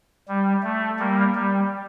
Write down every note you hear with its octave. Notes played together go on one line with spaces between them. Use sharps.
G3
A3
G3 A#3
G3